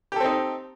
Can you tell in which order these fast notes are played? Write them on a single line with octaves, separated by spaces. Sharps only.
G4 A4 C4 D#4